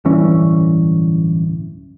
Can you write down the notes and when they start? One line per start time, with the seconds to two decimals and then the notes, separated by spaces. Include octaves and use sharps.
0.05 D1 G2 E3 C#4